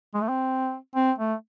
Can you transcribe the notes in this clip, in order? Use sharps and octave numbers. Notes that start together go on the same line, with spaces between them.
G#3
A3
C4
C4
A3